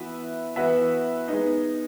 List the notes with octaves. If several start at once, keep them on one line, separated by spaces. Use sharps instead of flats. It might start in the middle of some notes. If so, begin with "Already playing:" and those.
Already playing: E3 B3 F#4 B4 E5
E3 B3 F#4 B4 E5
G#3 B3 D#4